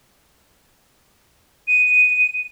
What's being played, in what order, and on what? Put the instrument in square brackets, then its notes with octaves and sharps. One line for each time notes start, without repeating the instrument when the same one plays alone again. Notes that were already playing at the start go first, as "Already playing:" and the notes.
[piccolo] D#7